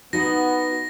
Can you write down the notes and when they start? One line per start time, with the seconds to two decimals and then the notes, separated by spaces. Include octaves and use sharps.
0.13 B3 D#4 F#4 F#5 A#6